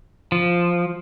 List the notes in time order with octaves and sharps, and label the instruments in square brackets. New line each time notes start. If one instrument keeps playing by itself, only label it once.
[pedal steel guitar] F3